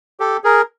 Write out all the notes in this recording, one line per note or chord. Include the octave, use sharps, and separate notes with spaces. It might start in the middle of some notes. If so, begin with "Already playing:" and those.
G4 A4
G#4 A#4